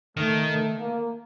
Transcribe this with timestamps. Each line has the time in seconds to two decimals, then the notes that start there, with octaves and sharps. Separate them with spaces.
0.17 D#3 A3
0.48 A3
0.78 A#3